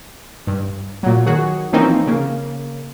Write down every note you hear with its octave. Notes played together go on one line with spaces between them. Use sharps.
G2
A#2 F#3
D#3 F#3 F#4 G#4
E3 F3 A#3 C4 C#4 D#4
C#3 A#3